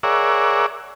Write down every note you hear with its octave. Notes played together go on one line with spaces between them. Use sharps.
G#4 A#4 C#5 D5 E5 F#5